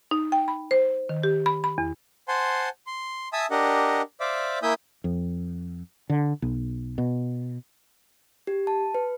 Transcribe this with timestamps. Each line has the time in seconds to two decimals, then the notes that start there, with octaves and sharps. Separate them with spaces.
0.11 D#4
0.32 G5
0.48 B5
0.71 C5
1.09 D#3
1.23 G4
1.46 B5
1.64 B5
1.78 E2
2.28 C5 F#5 G#5 A5 C6
2.87 C6
3.33 E5 G#5 A5 D#6 E6
3.51 D4 G4 A#4 D#5 F#5
4.20 C5 D5 E5 F5 D6
4.63 A#3 E4 E5 G#5 D#6 G6
5.04 F2
6.10 D3
6.42 B1
6.98 B2
8.47 G4
8.67 A5
8.95 B4